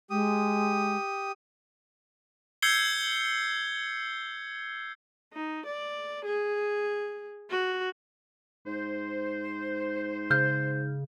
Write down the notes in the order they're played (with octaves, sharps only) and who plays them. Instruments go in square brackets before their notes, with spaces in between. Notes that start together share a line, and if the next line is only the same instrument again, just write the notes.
[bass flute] G#3 [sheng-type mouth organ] G4 D#6
[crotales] E6 G6 G#6 C7 C#7 G7
[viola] D#4
D5
G#4
F#4
[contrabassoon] G#2 [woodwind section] C5
[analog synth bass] C#3 [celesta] F6 G6